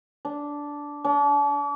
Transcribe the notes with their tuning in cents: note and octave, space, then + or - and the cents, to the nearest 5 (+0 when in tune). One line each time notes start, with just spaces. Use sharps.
D4 -10
D4 -40